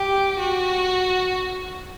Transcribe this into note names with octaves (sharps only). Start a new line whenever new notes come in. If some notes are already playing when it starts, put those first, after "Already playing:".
Already playing: G4
F#4